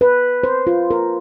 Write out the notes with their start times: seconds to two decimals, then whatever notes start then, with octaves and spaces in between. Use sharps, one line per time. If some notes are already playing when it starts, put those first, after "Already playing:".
0.01 B4
0.43 C5
0.67 F4
0.91 A#4